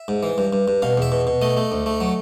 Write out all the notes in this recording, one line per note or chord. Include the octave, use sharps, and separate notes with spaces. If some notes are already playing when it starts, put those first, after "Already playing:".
Already playing: E5
G#2
E3
G2
G2
G2
B2 F5
E2 E5
B2
B2
A3 D#5
A3
D2
A3
F#3